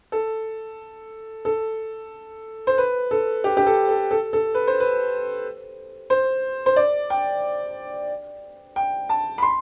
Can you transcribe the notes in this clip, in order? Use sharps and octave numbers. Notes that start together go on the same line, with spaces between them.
A4
A4
C5
B4
A4
G4
G4
A4
A4
A4
A4
B4
C5
B4
C5
C5
D5
G5
G5
A5
B5
C6